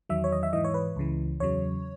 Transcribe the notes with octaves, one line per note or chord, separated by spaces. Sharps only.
E2 D#3 F#3 E5
C#5
D#5
E5
G#2 E3 D#5
C#5
B4
C#2 C#3 E3
E2 C#3 F#3 C#5